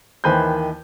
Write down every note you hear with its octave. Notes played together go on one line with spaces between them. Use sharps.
D#2 D#3 E3 B4 C5 G6